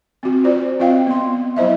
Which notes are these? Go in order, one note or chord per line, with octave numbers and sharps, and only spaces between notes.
C4 F#4
F4 F#4 C5 D5
C4 F4 D#5 F5 G5
B3 C6
F#3 E4 C5 D#5 E5